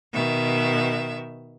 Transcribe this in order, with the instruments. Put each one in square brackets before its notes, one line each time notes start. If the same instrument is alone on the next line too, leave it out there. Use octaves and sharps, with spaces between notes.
[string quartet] B2 D#3 E5